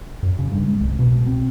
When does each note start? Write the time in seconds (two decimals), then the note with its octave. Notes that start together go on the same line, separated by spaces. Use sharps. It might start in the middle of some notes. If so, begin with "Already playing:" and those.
0.23 F#2
0.39 C#3
0.52 G2
0.67 G#3
0.81 C2
0.99 B2
1.26 C4